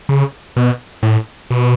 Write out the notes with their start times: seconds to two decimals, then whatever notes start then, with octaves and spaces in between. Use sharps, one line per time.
0.09 C#3
0.57 B2
1.03 A2
1.51 B2